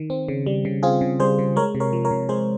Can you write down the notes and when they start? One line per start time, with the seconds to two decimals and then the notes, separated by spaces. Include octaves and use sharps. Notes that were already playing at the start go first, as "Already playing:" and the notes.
Already playing: D#3
0.10 C4
0.28 C#3
0.46 G3
0.65 C#3
0.83 C4 F4 G#4
1.01 C#3
1.20 G3 G#4 C5
1.39 C#3
1.56 G#3 A#4 C#5
1.75 C3
1.80 A#4 C#5
1.93 F3
2.05 A#4 C#5
2.11 C3
2.29 G#3 G#4 C5